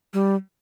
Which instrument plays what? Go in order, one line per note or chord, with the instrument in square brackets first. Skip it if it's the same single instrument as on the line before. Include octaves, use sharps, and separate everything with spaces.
[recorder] G3